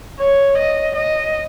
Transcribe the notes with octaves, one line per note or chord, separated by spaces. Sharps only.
C#5
D#5
D#5